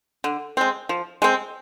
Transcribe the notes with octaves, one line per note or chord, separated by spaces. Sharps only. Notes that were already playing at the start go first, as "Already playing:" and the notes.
D3
G#3 C4
F3
G#3 C4